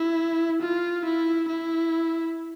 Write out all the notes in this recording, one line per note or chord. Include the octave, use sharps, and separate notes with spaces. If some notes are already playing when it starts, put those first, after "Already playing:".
Already playing: E4
F4
E4
E4